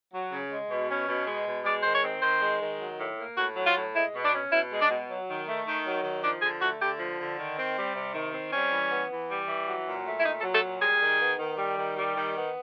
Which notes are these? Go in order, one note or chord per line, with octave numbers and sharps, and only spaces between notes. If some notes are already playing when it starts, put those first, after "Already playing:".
F#3
C#3
G#3
B2
C#4
B2
G#3
B2
G#3 D5
D#3 C5
C#5
C4
D#3 C5
G#3
D#3
F#3
A2
A#3
A2 F#4
F#3
F4
A2
G#3 E4
B2
D4
C#4
B2 E4
G#3
D4
B2
F#3
D#3
A3
D#3
F#3
D#3
F3 D4
D3 G#4
A3 F#4
D3 G4
F3
D3
D#3
C4
G3
C3
D#3
C4
G3 C#4
E3
B3
E3
G3
E3
F#3
A#2
A3
E4
A#2 D#4
A4
F#3
A4
A#2
G3 G#4
D#3
B3
D#3
G3
D#3
G3
D#3
B3